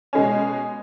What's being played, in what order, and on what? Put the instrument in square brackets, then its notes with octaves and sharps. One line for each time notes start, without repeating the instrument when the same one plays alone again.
[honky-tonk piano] B2 G#3 C#4